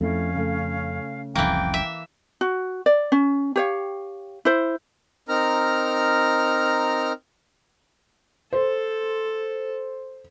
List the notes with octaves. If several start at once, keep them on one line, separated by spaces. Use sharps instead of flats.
F2 A3 C#4 E4 F5
C#3 A3
F1 C2 F2 E3 A#3 G5
E5
F#4
D5
C#4
G4 C#5 F5
E4 C5
C4 D#4 A#4 A#5 F6
A4 C5